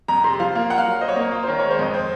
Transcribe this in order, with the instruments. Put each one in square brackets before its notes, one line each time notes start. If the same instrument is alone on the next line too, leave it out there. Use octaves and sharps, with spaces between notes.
[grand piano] F2 [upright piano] A#5
[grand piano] C3 [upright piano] C6
[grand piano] F3 [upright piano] F5
[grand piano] A#3 [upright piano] F5
[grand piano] F4 [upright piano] F#5
[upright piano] F5
[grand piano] F#3
[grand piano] C5 [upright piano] D#5
[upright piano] C#5
[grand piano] A#3 [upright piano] D#5
[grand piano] F4
[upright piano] C5
[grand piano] D#3 [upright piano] C#5
[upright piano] C#5
[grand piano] G#3
[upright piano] C5
[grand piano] F2 [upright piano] D#5
[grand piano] C4 [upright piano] C5